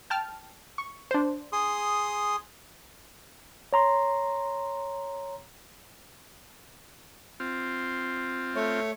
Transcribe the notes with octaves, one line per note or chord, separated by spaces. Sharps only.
G5 A5 F6
C#6
D4 C5
G#4 C6 D#6
C#5 A#5 C6
C4 F4
A3 C#5